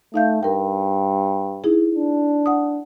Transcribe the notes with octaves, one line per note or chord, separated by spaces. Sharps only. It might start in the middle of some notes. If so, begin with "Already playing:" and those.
A3 D#4 F5 G6
G2 A#4 G5
D#4 E4 G#4
D4
F#5 D#6